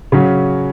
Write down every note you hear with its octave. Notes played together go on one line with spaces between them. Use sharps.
C#3 F#3 C#4